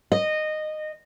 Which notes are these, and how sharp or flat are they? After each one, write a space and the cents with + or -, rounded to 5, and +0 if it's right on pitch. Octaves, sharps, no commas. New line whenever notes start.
D#5 -15